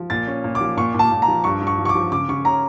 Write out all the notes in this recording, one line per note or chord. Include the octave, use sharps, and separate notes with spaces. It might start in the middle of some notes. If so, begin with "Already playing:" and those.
Already playing: F3
A#2 A6
C#4
A#2
D6
F3
A#2 C#6
A#2 A5
A#2
A#5
F3
G2 C#6
G2
C#6
F3
C#6
D6
F3
C#3 D6
C#3 C#6
C#4 A#5